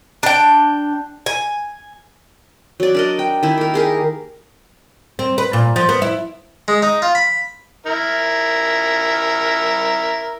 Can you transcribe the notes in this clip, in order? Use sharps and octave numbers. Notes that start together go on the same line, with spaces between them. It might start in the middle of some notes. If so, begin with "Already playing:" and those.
D4 G5
G#5
F#3 D5
D4 A#4 D#5
G5
D#3 E4
A#3 A#4
G4 G#4 A#4
C4
B4
A#2
F3
B3
E4
G#3
D#4
F4
B5
E4 A#4